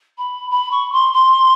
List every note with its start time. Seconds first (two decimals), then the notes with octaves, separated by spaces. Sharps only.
0.18 B5
0.50 B5
0.71 C#6
0.92 C6
1.14 C6